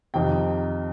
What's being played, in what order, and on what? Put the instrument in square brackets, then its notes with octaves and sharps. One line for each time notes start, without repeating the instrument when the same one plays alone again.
[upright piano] F2 C3 D#3 G5